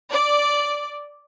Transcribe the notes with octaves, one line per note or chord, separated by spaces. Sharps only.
D5